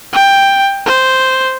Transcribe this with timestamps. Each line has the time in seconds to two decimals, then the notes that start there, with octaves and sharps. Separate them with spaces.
0.13 G5
0.86 C5